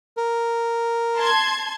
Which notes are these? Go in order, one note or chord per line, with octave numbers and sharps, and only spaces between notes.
A#4
A5 C6 G#6